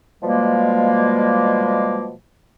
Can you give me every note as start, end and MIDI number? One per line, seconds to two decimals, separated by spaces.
0.22 2.14 47
0.22 2.14 53
0.22 2.14 55
0.22 2.14 56
0.22 2.14 58